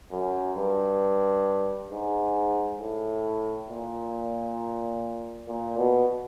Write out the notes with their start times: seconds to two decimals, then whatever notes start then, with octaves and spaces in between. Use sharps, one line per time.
0.12 F#2
0.57 G2
1.91 G#2
2.80 A2
3.69 A#2
5.48 A#2
5.77 B2